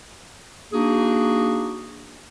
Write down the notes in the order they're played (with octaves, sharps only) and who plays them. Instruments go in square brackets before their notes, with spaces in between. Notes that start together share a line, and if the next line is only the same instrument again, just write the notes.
[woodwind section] A#3 D4 D#4 F#4 G#4